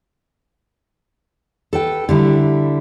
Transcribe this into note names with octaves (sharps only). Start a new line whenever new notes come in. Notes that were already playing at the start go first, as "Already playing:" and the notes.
A4 B4 G5
D3 G3 E4